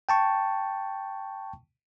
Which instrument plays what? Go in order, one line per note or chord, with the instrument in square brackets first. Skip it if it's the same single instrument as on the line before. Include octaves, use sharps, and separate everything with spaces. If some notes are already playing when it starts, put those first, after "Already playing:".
[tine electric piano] G5 A5 C#6